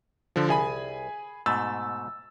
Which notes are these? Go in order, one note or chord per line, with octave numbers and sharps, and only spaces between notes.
D3 F3
C2 G#4 G#5 B5
G#2 B2 A3 E6 A6